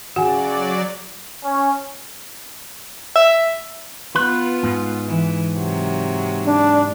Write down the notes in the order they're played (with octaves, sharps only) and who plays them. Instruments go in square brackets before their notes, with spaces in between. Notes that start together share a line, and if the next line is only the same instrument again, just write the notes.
[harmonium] C#3 [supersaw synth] F#3 D5 [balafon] F#4 [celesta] F#5 G#5
[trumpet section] C#4
[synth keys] E5
[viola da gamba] B3 F4 [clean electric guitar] B4
[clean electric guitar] G#2
[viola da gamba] E3
C3 F#3
[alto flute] D4